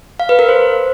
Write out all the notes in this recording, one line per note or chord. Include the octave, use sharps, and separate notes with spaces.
F5
B4
A#4
C5